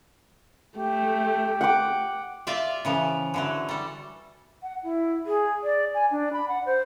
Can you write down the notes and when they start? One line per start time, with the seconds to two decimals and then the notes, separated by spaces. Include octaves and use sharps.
0.78 A3 G4
1.61 F#5 G5 D6
2.47 F4 D5 E5 F5
2.85 C#3 E3 F3
3.34 D3 E3 F#3
3.69 G3 A4
4.62 F#5
4.83 E4
5.26 G#4
5.63 D5
5.94 G#5
6.11 D4
6.33 B5
6.49 F#5
6.66 C5